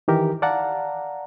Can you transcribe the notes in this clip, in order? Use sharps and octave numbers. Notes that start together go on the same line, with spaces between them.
D#3 E3 G4 A#4
D5 F5 F#5 A5 A#5